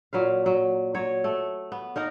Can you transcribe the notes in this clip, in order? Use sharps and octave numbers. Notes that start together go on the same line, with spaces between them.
A#2 F#3 B4 F5
F#3
F#3 C#5
A3
B3
A#3 D#4 A#4